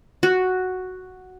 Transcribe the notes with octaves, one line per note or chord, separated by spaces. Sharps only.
F#4